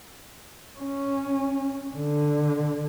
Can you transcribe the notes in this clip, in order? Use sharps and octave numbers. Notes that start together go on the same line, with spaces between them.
C#4
D3